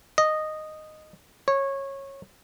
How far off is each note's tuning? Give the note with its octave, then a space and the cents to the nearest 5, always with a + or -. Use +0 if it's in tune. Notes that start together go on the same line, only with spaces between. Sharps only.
D#5 -5
C#5 -15